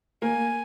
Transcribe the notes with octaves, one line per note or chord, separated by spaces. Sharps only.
A#3 G#5